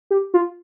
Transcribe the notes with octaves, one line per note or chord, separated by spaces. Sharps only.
G4
F4